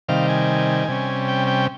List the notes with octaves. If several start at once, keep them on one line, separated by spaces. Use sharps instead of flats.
C3 D#3 G3 F5
G#5
C3 G3 C#4
G5
G5